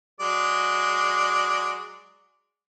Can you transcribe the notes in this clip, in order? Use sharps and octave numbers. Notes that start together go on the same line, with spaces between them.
F#3 G#3 D5